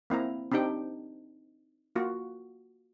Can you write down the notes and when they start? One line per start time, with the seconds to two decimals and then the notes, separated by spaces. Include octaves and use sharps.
0.10 A#3 C4 E4 A#5
0.52 C4 D4 D#4 G4 G5
1.96 A#3 F4 F#4